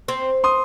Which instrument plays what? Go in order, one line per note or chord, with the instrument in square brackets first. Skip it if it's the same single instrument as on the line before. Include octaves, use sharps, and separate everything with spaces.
[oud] C4
[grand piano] C6 D#6